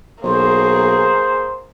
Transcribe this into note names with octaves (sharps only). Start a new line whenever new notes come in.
B1 A#3 G#4 C5